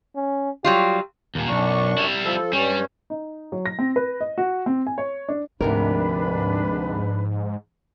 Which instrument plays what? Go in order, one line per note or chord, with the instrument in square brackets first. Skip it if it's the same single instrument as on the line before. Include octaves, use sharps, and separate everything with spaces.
[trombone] C#4
[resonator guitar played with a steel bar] F#3 G3 F4 [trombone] G4
[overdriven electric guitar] D#2 A#2
[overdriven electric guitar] B1 [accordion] F#2 D4 C#6
[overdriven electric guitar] G3 E4
[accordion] F3 A4
[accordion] G2 C#4 [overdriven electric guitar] G3
[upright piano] D#4
F#3
A#6
C4
B4
D#5
F#4
C4
G#5
C#5
D4
[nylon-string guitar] D2 C3 A#4 [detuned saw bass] G#2 [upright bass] F3 [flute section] D4 B4 B5